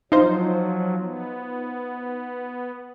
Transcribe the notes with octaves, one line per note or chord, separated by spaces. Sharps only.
F3 F#3 D#4 F4 C5
B3